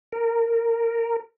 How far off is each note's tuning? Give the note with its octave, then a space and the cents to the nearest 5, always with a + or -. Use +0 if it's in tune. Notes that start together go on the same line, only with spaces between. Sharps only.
A#4 -15